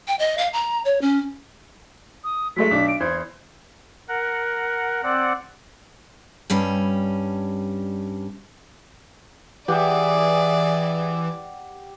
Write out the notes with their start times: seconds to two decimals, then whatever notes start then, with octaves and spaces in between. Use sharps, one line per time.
0.08 G5
0.19 D#5
0.38 F5
0.53 A#5
0.85 C#5
1.01 C#4
2.24 D#6
2.56 F#3 G#3 A3 B6
2.71 B1 D4
2.89 D7
3.00 E2 C5 G#6
4.09 A#4 F#5
5.03 C4 D5 F#5
6.50 G2 G3 C#4
9.68 E3 G4 G#4 D5 E5 F#5